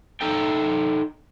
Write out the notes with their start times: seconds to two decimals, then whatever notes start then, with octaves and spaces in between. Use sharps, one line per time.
0.21 D#4 A4 G5